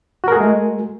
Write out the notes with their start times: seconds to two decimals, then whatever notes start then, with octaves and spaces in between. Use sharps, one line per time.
0.24 F#4
0.28 A#4
0.32 G#4
0.36 A3
0.41 G#3